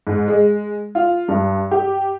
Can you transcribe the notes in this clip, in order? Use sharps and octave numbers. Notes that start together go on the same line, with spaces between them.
G#2
G#3
F4
G2
G4